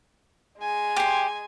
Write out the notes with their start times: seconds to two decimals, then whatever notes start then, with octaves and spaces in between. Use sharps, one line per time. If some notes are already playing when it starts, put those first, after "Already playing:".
0.58 G#3 G#5
0.96 G4 C6